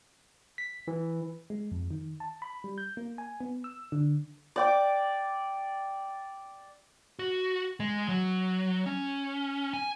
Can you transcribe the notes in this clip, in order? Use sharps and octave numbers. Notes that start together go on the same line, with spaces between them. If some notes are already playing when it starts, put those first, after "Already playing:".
B6
E3
G#3
F2
D#3
A5
B5
G3
G6
A#3
G#5
B3
E6
D3
D5 G5 D6
F#4
G#3
F#3
C#4
G#5